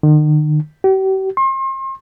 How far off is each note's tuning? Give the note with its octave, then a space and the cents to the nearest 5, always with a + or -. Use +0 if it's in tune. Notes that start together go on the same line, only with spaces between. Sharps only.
D#3 -45
G4 -40
C6 +40